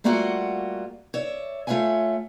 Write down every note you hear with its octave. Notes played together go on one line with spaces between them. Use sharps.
G3 A3 A#3 F4 F#4 F#5
C#5 D5 E5
A3 F4 C#5 E5 F#5 G#5